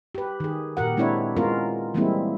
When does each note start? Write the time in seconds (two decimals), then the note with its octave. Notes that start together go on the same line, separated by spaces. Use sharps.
0.15 G4 B4
0.40 D#3 G#4
0.77 A#2 G4 A#4 F#5
0.97 G#3 C4 D4 E4 C#5 D5
1.36 G#3 B3 C#4 F4 A#4
1.94 E3 G3 G#3 A#3 C4 E4